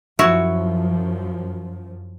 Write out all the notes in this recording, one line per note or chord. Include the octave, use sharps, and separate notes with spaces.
F#2 F3 E4 F#4 C#5